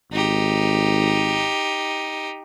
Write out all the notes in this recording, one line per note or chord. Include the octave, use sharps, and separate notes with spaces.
G#1 D#4 G4